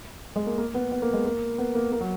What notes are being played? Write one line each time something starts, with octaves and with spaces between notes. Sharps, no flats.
G#3
A#3
A#3
B3
B3
A#3
G#3
A#3
B3
A#3
A#3
F#3